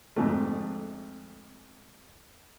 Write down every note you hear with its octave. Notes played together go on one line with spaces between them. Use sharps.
F2 G#2 D3 A3